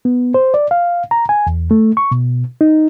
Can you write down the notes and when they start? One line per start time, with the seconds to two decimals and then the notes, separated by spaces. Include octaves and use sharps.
0.05 B3
0.34 C5
0.54 D5
0.71 F5
1.11 A#5
1.29 G#5
1.47 E2
1.71 A3
1.97 C#6
2.11 B2
2.61 D#4